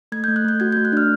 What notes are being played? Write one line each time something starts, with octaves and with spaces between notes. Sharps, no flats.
A3 G#6
A3 G6
F#6
A3 G6
F#4 G#6
A3 G6
F#6
D4 F6